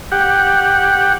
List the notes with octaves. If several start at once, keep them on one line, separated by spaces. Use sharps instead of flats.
G4 F#5